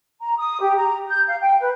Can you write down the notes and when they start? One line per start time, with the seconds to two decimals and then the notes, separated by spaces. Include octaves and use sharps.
0.21 A#5
0.37 D#6
0.61 G4
0.77 A#5
1.08 G6
1.28 F5
1.41 G5
1.60 B4